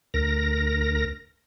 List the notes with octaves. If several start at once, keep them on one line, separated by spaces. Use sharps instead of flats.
D2 A#4 A#6